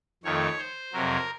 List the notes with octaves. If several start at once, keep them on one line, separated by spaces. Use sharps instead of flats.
F2 D#3 A3 C#5
C5
F2 C3 F#3 A#4